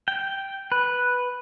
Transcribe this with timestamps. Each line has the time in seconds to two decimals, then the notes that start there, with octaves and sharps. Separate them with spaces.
0.08 G5
0.72 B4